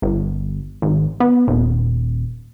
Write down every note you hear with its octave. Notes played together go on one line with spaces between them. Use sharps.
G1
G#1
B3
D#1